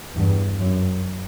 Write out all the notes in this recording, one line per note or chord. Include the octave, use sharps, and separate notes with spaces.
E2 G2
F#2